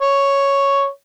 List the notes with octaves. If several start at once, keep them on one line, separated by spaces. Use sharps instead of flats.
C#5